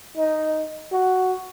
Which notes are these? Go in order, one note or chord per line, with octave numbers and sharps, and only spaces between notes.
D#4
F#4